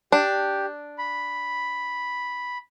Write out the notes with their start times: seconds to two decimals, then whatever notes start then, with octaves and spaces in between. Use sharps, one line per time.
0.12 D4 G4
0.98 B5